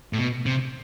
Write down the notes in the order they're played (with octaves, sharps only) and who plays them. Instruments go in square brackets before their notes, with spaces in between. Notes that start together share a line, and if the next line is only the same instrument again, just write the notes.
[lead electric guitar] A2
B2
C3